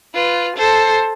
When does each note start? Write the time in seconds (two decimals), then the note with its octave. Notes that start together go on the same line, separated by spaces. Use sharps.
0.14 F4 B4
0.57 A4 C5